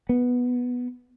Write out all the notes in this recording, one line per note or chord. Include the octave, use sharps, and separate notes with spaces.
B3